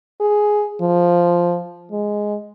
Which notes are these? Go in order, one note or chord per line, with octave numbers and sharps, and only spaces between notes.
G#4
F3
G#3